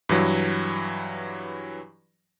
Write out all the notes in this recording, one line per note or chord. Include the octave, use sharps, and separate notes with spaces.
G2 E3 F#3